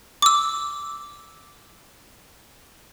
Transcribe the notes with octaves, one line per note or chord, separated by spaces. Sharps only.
D6 E6